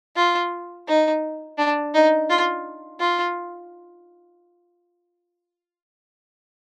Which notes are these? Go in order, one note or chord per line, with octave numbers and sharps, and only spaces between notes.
F4
D#4
D4
D#4
F4
F4